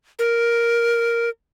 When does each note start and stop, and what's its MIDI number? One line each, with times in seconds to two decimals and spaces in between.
0.19 1.29 70